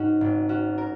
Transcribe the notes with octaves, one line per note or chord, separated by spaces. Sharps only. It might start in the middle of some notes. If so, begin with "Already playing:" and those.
Already playing: G#2 C#4 D#4 F#4
G#1
C#4 F#4
A#4